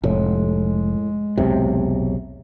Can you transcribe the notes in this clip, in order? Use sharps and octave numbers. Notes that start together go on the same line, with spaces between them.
F1 A2 G#3
B1 E2 A2 C3